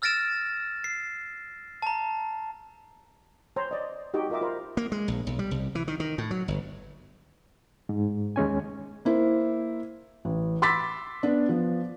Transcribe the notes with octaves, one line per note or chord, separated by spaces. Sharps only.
E6 F6 A6 A#6 D7 E7
C7
A5 A#5
C5 C#5 A#5 C6
D5 D#5
D#4 F#4 G4 D#5 G5
F4 A#4 D#5 E5 D6
F4 A#4 C5 B5
A#3
G#3
A#1
B1
G3
C2
E3
D#3
D#3
A2
F#3
G1
G#2
D#2 G#3 C#4 G#5
A#3 E4 C5
A1
B5 C6 D6 E6 A6 B6
B3 D4
F3 B3